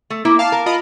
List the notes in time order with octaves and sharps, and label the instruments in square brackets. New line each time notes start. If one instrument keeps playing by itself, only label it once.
[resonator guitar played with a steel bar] A3
[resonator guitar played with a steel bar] A#3 [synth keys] E4
[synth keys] F5 A5
[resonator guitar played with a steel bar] A#4
[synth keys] F4 D#5 B5